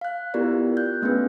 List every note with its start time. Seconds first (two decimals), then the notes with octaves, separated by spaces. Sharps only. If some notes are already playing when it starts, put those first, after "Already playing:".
0.01 F5 F#6
0.34 B3 E4 F4 G4 A#4 D5
0.77 F#6 G6
1.02 A3 B3 C#4 D4 G#4 B4